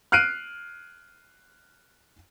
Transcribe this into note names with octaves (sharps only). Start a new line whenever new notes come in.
F6 F#6 C7 D7 D#7